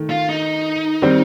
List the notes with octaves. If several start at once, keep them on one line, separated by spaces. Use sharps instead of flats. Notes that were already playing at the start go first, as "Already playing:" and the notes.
Already playing: D#3 A3
F4
D#4
D#3 G3 C4